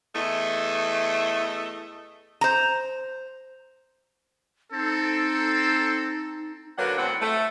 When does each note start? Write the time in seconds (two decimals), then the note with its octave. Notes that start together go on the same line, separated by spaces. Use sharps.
0.14 E2 A3 D#5 E5
2.41 C5 A#5
4.72 C4 D#4 A4
6.78 D3 F#3 A#3 D4 B4 F#5
6.97 E2 A2 F#3 C4 F#5
7.21 A3